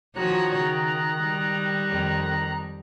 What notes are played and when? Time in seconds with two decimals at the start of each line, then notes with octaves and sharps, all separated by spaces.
0.16 D#3 F3 F#4 C#5 A#5 F#6
0.56 C#3
1.22 G3
1.90 F2 D#3